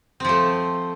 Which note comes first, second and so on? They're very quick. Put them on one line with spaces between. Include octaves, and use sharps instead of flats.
C4 F3 A3